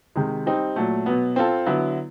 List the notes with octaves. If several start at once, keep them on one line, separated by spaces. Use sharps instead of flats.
C3 D#3 G#3
G3 C4 D#4
A#2 F#3 A3
B2 F#3 B3
C4 F4 A4
D3 F#3 B3 E4